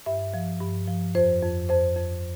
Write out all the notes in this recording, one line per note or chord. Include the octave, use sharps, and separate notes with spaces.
G2 E5
F3
G2
F3
F2 C5
F2
F2 C5
F2